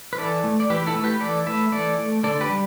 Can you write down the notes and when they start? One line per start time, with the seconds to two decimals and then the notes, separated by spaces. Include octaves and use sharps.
0.13 B4
0.18 E3 A4 D5
0.44 A3
0.60 D5
0.70 E3 G4 B4
0.87 E4 A4
0.95 A3
1.04 G4 B4
1.21 E3 A4 D5
1.47 A3 B4 E5
1.72 E3 A4 D5
1.99 A3
2.24 D3 A4 D5
2.41 G4 B4
2.49 G3